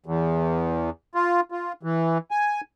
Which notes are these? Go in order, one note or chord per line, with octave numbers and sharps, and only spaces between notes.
E2
F4
F4
E3
G#5